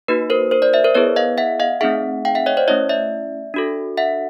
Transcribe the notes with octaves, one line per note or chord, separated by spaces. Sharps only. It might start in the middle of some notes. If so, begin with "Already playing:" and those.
A#3 D#4 F#4 B4
A#4 C5
A#4 C5
C5 D5
D5 E5
A#4 C5
B3 E4 G#4 B4 C#5
D#5 F5
E5 F#5
D#5 F5
A3 C4 D#4 G#4 E5 F#5
F5 G5
E5 F#5
C#5 D#5
C5 D5
A3 C#4 E4 C#5 D#5
D5 E5
D4 F#4 A4
E5 F#5